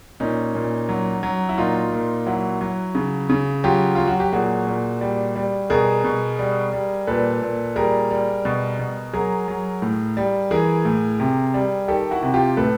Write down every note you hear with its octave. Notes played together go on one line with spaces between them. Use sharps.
A#2 C#4 D#4
A#2
F#3
F#3
E4
A#2 D#4 F4
A#2
F#3 E4 F#4
F#3
C#3
C#3
F#3 F4 G4
F#3 F4
F#4
G4
A#2 F#4 G#4
A#2
G3
G3
B2 G#4 A#4
B2
G3
G3
A#2 A4 B4
A#2
G3 G#4 A#4
G3
B2
B2
F#3 G#4 A#4
F#3
A2
G3
E3 G#4 A#4
A2
C3
G3
D#3 G4 A4
E4 F#4
C3
F4 G4
A2 A4 B4